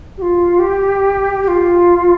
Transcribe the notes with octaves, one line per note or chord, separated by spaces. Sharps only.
G4
F4
G4
G4
F4